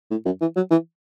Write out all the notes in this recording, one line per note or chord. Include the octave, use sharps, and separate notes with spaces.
A2
F#2
E3
F#3
E3